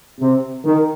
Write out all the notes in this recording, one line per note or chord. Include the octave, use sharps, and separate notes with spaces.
C3
D#3